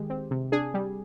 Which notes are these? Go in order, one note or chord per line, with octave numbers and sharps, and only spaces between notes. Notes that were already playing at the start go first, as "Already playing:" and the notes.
Already playing: D#3 G#3 G4
C4
C3
D4 G#4
G3